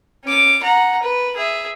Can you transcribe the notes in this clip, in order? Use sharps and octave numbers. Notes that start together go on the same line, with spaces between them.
C#4 D6
F#5 A#5
B4
G#4 E5